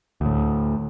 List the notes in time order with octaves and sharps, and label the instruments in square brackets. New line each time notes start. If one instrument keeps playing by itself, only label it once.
[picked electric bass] D2 A2